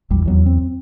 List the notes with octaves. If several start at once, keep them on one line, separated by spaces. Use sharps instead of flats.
A#1 E2 G3
D#2 F#3 B3
C4